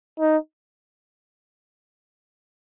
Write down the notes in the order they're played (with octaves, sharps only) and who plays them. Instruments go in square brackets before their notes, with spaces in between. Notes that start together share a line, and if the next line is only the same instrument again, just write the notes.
[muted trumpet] D#4